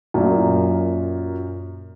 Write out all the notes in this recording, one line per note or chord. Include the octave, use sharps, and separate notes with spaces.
F#2 A#2